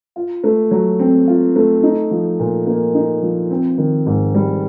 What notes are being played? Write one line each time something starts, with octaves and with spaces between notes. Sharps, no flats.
F4
A3
F#3
C4
F4
A3
D#4
F3
A#2
A#3
D#4
F3
C4
D#3
G#2
G3